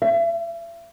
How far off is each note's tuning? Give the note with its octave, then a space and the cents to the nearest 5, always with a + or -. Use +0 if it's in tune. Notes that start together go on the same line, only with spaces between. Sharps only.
E5 +40